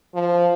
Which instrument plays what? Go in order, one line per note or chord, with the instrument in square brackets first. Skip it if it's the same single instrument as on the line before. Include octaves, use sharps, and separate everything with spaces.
[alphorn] F3